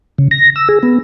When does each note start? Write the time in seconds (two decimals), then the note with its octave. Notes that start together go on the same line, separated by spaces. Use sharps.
0.18 C#3
0.31 A#6
0.56 E6
0.69 G#4
0.83 B3